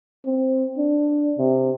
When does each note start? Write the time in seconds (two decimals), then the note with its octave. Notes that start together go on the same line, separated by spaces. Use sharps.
0.25 C4
0.78 D4
1.38 C3